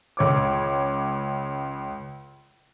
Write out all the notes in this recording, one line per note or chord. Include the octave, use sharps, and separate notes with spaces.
C#2 C#5 D6